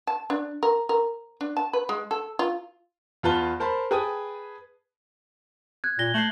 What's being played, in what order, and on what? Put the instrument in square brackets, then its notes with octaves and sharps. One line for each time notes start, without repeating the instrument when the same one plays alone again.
[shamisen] A5
D4
A#4
A#4
D4
A5
B4
G#3
A4
F4
[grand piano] E2 F4 B4 A5 G7
A#4 C5 A5 B5
G#4 B4 G5 A5 D#6
[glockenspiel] F#6 G#6
[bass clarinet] A#2 [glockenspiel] A#6 G7
[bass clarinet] A3 [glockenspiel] C7 F#7